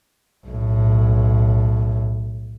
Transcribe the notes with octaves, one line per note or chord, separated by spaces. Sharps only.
B1 A2